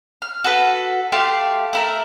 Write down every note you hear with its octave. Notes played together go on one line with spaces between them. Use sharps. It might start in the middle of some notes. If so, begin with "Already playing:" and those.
F6
F#4 A4 B4
A3 G4 F5 C6
A3 E4 A#4